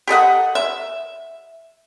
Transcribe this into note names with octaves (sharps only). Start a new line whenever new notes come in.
G4 A4 D#5 F#5
E5